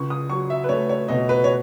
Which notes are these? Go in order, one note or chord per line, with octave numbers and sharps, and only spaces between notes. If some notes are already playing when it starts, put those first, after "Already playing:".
Already playing: C#2 C#6
D#6
F#3 C#6
E5
B4
A3 C#5
C#5
B2 D#5
B4
C#5